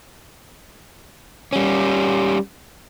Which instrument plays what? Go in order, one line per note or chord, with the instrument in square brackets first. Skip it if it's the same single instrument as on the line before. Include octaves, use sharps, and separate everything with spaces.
[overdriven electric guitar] G3 C#4